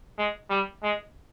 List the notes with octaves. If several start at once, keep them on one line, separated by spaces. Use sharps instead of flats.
G#3
G3
G#3